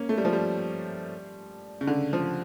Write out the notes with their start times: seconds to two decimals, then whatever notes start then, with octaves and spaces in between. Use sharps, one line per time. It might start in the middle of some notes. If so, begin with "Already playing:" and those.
Already playing: A#3 C#4
0.09 A3
0.18 G3
0.25 F3
0.33 G3
1.81 C#3
1.87 D3
2.13 F3